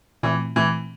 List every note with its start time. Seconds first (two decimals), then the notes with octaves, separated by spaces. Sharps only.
0.23 A#2 E3 A3 C4
0.56 A#2 E3 A3 C4